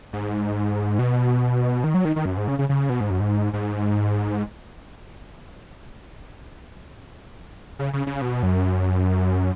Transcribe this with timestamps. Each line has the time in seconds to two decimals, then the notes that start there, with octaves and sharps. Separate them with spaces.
0.13 G#2
0.99 B2
1.84 D#3
1.94 F#3
2.05 D#3
2.16 D#3
2.26 F#2
2.37 G#2
2.48 C#3
2.59 C#3
2.69 C#3
2.90 B2
3.01 G#2
3.10 F#2
3.20 G#2
3.53 G#2
7.79 C#3
7.93 C#3
8.07 C#3
8.22 B2
8.43 F#2